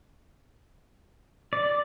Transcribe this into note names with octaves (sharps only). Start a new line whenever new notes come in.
D5